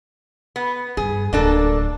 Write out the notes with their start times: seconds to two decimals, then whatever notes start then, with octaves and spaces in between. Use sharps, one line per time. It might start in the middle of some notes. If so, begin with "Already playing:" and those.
0.56 B3
0.97 G2 G#4
1.33 D1 F#3 A#3 D4 A4